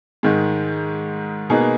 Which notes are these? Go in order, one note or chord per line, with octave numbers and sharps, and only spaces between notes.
G#2 D#3 G#3
B2 A#3 D#4 G#4 B4